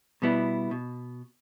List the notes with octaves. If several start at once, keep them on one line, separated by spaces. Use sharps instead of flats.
B2 G3 B3 E4
B2